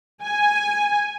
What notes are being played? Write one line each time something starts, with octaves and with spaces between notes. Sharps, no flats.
G#5